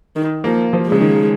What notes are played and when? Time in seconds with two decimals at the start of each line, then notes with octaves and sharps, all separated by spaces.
0.16 D#3
0.44 F3 A#3
0.73 F3
0.87 C#3 G#3
1.01 D#3